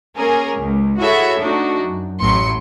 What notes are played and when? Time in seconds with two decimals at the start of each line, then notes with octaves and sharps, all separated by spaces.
0.15 A#3 C#4 G#4 A#4
0.58 C#2
0.98 E4 F#4 G#4 A4 C#5 E5
1.38 A3 D4 D#4 F#4
1.81 F#2
2.20 A1 A2 F#3 C6 C#7